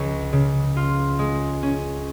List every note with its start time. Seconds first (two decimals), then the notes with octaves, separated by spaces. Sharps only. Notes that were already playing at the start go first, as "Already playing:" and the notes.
Already playing: C#2 F3 C#4
0.32 C#3
0.77 F4
1.19 G#3
1.63 C#4